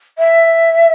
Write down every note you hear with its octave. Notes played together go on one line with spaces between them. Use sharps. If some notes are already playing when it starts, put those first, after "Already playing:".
E5